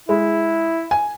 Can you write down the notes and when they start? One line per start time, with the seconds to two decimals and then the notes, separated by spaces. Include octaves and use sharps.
0.09 G#3 E4
0.91 G#5